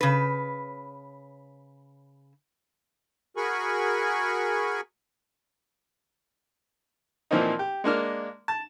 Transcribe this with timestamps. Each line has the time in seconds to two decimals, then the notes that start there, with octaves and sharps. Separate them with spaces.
0.01 C#3 B4
3.37 F#4 G#4 A#4 G#5 B5 C#6
7.31 A#2 E3 F3 A#3 C4 D#4
7.59 G4
7.84 G#3 A#3 D4 F6
8.48 A5